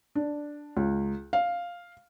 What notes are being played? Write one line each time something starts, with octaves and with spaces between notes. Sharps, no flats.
D4
C#2
F5